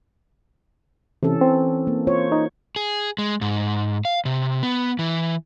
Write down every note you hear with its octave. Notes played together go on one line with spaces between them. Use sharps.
C3 E3 C#4 A4
C4
A#3
F4 C5 C#5
D#4
G#4
G#3
G#2
F5
C3
B3
E3